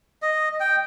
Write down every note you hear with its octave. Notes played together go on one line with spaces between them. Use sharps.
D#5
G5